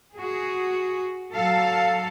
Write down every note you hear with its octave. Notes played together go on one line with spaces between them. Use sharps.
F#4 G#4
F#3 A4 F5